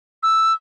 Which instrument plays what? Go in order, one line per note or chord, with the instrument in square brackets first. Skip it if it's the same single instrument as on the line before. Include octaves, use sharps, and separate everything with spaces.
[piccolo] E6